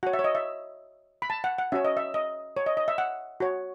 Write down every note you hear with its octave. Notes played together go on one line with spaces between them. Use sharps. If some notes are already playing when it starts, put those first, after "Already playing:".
F#4 C#5 F#5
E5
C#5
D#5
E5
B5
A5
F#5
F#5
C#4 F#4 C#5 E5
D#5
E5
D#5
C#5
D#5
D#5
E5
F#5
F#4 C#5